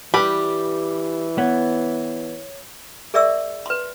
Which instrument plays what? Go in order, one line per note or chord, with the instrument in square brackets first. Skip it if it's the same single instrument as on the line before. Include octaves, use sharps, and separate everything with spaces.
[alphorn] E3 [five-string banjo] G3 B5 [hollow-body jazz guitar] G4 B4 [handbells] D6
[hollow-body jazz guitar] B3 [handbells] C#5
[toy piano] G#4 A#4 D5 E5 C#6 E6
B4 C6